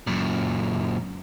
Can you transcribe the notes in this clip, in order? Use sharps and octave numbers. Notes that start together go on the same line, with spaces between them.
F#2 A#2